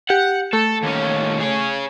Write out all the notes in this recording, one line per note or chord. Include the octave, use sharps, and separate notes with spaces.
G4 F#5
A3 A4
D#2 C#4
G#4 C#5